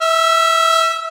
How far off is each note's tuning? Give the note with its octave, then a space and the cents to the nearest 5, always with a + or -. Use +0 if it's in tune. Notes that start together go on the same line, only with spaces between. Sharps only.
E5 -15 E6 +35